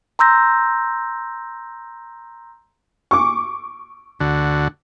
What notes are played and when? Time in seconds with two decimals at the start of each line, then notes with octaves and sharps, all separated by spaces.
0.19 A#5 C6 E6 G6 A#6
3.11 C#6 D6
4.20 D2 D3 F#4